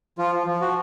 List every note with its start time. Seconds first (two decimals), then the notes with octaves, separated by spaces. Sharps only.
0.18 F3 F4
0.47 F3
0.61 F#4